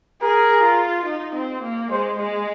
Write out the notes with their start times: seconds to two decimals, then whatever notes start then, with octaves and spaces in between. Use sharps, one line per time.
0.22 G#4 A#4
0.64 F4
1.06 D#4
1.35 C4
1.63 A#3
1.91 G#3 C5
2.19 G#3